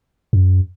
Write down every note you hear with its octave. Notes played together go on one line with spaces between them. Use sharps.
F#2